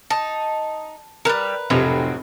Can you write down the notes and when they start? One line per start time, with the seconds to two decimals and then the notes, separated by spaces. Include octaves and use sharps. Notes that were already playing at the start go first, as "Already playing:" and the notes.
0.10 D#4 A5
1.25 E3 G3 A#4 B4
1.70 F1 A2 F#3 C4